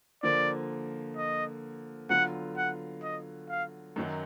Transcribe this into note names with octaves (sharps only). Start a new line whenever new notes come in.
D3 F3 A#3 F4 A#4 D5
D#5
D3 F#3 B3 F4 F#5
F#5
D#5
F5
F#2 D#3 F#3